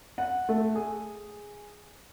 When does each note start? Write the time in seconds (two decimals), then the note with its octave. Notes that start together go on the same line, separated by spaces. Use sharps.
0.18 F#5
0.49 A3
0.75 G#4